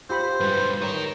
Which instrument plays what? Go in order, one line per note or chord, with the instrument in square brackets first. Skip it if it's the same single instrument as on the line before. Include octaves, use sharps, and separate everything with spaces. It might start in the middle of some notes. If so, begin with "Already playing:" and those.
[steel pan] F4 G4 B5 [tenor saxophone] C5
[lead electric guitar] G#2 G3 [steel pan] B4
[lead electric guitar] D#4 A#4 [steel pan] C#5 C#6